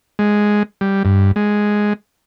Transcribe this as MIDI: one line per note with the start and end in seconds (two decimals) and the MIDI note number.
0.19 0.63 56
0.81 1.03 55
1.05 1.32 43
1.36 1.93 56